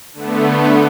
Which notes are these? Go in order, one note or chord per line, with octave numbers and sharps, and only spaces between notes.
D3 A3 B3